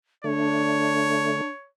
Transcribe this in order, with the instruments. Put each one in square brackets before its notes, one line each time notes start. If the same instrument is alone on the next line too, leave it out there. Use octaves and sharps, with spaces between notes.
[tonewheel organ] D3 A3 [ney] D4 [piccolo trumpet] C#5